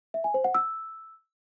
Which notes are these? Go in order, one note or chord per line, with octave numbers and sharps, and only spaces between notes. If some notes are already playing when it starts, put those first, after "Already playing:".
E5
G#5
C5
F#5
E6